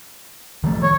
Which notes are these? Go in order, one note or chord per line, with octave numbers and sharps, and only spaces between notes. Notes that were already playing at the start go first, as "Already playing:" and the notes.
D#3 F3 A3
C#5